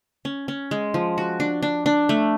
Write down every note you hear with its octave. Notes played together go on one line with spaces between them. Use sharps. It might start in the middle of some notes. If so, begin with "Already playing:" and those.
C#4
C#4
G#3
F3
F#4
D4
D4
D4
A3